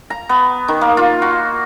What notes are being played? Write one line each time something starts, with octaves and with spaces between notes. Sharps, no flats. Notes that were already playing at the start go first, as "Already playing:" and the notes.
A#5
B3
D#3
A#3
F4
F#4